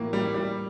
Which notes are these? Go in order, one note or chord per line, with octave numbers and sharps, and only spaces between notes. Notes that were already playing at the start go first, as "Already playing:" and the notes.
Already playing: A2 E3 A#3
G3
G3